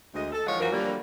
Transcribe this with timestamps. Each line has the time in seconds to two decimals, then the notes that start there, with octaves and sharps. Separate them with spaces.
0.14 D2 G#3 D#5
0.32 A4
0.47 E3 F3 G#3 C#5 F5 F#5
0.60 F#2 E3 F3 F#4 A#4
0.72 D3 G3 A#3